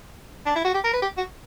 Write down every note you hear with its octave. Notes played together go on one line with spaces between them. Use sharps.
D4
E4
F#4
G4
A#4
B4
G4
F#4